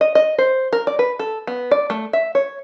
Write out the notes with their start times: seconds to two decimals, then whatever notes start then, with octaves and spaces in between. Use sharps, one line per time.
0.01 D#5
0.15 D#5
0.38 C5
0.73 A#4
0.87 D5
0.99 B4
1.19 A4
1.47 B3
1.71 D5
1.90 A3
2.13 E5
2.35 C#5